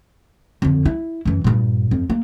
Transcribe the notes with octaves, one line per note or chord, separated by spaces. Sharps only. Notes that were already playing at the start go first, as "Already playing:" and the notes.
F2 D3
E4
F#2 E3
G2 A#2
F2
A#3